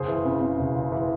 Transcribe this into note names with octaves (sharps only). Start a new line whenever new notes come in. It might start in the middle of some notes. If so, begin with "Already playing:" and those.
Already playing: F#1 G#4 C5
E3
C#3
C#3
F#1
F#1
E3